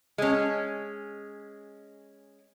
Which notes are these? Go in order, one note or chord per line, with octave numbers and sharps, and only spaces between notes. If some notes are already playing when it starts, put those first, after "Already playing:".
G#3 C#4